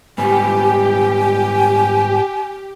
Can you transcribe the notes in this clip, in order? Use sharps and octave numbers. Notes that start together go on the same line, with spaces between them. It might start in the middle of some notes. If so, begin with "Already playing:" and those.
G#2 G3 B3 G4 G#5